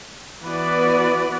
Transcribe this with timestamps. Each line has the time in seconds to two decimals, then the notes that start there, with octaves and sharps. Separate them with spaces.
0.43 E3 B3 F#4 B4 D5